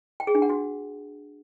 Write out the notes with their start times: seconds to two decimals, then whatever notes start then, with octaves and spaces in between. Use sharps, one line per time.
0.20 G5
0.27 G#4
0.35 D4
0.42 F#5
0.49 F#4